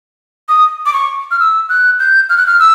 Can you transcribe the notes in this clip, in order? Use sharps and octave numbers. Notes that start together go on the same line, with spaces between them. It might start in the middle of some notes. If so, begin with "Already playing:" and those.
D#6
D6
C#6
F6
E6
F#6
G6
F6
F#6
F6
E6